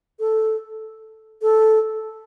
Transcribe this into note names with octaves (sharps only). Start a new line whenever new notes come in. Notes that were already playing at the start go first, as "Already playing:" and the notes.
A4
A4